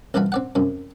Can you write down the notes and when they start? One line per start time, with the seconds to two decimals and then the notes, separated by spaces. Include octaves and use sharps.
0.14 C2 E3 F3 F#4 B5
0.32 C4 D5 F#5
0.55 F#2 C3